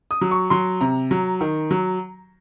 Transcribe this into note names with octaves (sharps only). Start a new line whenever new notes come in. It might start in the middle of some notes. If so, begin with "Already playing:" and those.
D#6
F#3
C#6
F#3 C6
C3 A#5
F#3
D#3
F#3